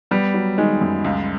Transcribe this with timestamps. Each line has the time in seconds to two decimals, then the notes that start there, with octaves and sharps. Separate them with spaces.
0.11 G3 B3
0.34 F#3
0.58 D#3 G#3
0.81 F#2
1.04 C#2